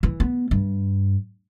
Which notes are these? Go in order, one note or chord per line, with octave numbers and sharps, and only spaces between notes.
E3
B3
G2